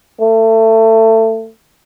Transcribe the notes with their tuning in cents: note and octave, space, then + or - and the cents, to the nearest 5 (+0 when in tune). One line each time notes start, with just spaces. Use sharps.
A3 +25